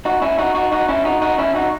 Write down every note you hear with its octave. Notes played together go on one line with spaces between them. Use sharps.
D#4 F#4
C#4 E4
D#4 F#4
D#4 F#4
D#4 F#4
C#4 E4
D#4 F#4
D#4 F#4
C#4 E4
D#4 F#4